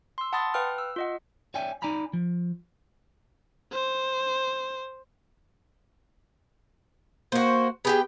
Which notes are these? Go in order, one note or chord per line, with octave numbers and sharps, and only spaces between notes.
C6 E6
F#5 A5 B5 C6 D#6 A6
B4 F5 G5 F6
E6
F4 D#5 F#5
C#5 D5 E5 G5 G#5
D#4 D5 G#5 A#5 B5
F3
C5
A#3 F#4 C5
B3 G4 G#4 G5